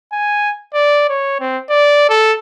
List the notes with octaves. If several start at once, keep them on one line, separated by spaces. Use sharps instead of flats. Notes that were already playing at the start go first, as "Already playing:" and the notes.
G#5
D5
C#5
C4
D5
A4